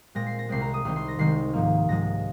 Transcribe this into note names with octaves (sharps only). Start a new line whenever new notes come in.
A#2 G#3 C4 A#6
C7
A#6
C2 C3 G#3 C4 C7
A#5
D#6
C2 C3 D#3 C6
C6
A#6
C2 C3 D#3 G#3 C4 C7
G#2 F3 A#3
G#2 F3 G#3 A#6